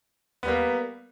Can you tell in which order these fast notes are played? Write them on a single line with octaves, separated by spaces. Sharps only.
B3 G3 A#3